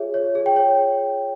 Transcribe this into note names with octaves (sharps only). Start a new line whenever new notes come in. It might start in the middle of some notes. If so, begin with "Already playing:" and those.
Already playing: F4 G#4 C#5 E5
C#5
G#4
G5
C#5